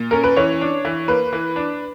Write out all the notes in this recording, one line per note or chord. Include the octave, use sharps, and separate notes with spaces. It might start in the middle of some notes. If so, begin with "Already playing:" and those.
Already playing: A#2
C#4 A#4
B4
E3 C#5
D4
E3
A#3 B4
E3
D4